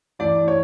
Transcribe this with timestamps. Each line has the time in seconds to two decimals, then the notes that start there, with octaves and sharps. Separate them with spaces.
0.19 G2 E3 A3 E4 D5
0.48 C#5